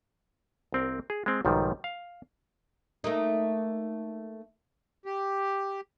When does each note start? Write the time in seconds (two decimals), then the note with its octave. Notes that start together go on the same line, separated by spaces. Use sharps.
0.72 C2 C4 A#4
1.10 G#4
1.26 G#3 C4
1.45 B1 G#2 D#3 F3 G3
1.84 F5
3.04 A3 A#3 D#4
5.06 G4